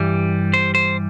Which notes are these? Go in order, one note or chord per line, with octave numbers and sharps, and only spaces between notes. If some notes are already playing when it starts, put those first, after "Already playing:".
Already playing: G2 E3 G3
C5
C5